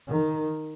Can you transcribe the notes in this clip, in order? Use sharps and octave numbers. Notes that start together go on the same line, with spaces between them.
D#3